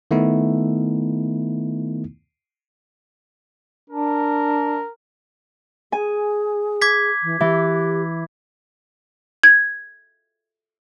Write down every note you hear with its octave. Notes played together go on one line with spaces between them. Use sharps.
D#3 A3 B3 D#4 E4
D4 A#4
G#4 G#5
D6 G#6 B6
E3
E3 G4
G#6